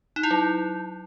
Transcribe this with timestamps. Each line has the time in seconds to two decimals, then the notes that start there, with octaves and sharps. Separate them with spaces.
0.16 D#4
0.23 E4
0.31 F#3